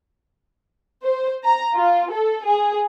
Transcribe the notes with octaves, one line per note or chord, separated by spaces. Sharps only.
C5
A#5
F4
A4
G#4